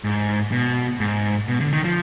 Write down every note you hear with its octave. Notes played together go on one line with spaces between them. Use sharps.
G#2
B2
G#2
B2
D3
D#3
F3